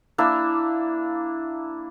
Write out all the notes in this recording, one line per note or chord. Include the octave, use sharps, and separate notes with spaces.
A#3 D4 E4 E5